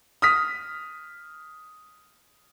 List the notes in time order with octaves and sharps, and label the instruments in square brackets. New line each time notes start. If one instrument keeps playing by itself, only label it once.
[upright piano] D#6 F6 B6